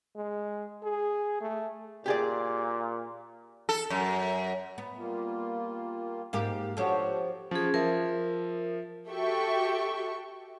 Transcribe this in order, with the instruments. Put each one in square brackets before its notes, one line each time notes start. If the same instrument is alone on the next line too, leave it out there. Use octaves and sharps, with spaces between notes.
[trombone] G#3
G#4
A3
[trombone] A#2 [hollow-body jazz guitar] G4 G#4 D5
[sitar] A4
F#2
[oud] B3
[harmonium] G3 A#3 F4
[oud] G#2 A#3 G4 [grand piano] F5
[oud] F3 G4 [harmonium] D4 F#4 [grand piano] A4 C#5 F#5
[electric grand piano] F3 [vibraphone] C#4 G#4
[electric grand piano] F3 E5 [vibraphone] A#4
[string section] F#4 G4 A4 E5 G5 C#6